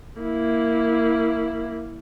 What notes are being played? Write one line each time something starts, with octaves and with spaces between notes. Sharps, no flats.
A#3 E4